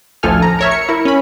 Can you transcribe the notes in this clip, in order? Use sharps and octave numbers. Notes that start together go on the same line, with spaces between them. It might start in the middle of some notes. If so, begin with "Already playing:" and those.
A1 D2 F3 A4 G#5 F6
A#5
A#4 C#5 E5
C#7
E4 A#4
C#4 B5